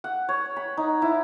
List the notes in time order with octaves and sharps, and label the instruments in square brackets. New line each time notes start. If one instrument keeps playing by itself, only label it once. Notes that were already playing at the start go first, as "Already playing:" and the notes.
[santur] F#5
C#5
B5
D#4
E4